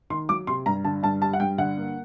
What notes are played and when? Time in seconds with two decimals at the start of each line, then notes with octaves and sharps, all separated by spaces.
0.10 D#3 C6
0.29 F#3 D6
0.47 C3 C6
0.66 G2 A#5
0.85 D3 A5
1.03 G2 A5
1.21 G3 A5
1.33 F#5
1.40 G2 G5
1.58 D3 F#5
1.77 A#3